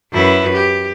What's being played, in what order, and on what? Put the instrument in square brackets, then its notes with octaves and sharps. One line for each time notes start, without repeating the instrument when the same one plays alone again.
[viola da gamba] F#2 E4 B4
G4